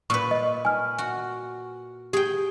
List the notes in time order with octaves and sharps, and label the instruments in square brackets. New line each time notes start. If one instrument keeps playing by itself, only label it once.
[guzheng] A#2 B4 [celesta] C#6
[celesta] D#5
G#5 F6
[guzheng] F#4
[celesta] G4 [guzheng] G#4 G5